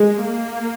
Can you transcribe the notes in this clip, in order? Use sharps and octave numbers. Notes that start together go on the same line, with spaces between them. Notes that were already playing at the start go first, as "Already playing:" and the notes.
Already playing: G#3
A#3